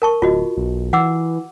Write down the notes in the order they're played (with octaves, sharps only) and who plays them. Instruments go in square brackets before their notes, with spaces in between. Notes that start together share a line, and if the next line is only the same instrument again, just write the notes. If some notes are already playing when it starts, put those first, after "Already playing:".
[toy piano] A#4 A5 C#6
[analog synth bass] D1 [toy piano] F4 F#4 D#5
[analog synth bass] B1
[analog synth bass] E3 [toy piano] F#5 D6 E6